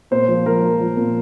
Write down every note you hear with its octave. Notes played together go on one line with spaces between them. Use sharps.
A#2 C5
F3
F3 A#4
F3
F3
A#2